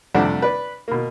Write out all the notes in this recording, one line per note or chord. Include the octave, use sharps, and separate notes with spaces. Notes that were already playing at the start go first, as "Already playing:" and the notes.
F2 C3 G3 A3 D4 F#5
B4 D5
B2 A#3